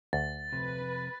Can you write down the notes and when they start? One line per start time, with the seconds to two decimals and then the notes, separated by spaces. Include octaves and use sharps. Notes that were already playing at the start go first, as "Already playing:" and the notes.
0.13 D2 A6
0.52 F2 C3 B4